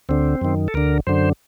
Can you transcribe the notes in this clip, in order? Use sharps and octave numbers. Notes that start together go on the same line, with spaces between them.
D2 D3 C4
F#2 D#3
A4
D2 D3 A#4
F#2 D3 C5